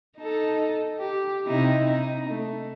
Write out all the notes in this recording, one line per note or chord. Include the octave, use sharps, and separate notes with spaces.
D#4 A4
G4
C3 D#4 E4
D#4
A3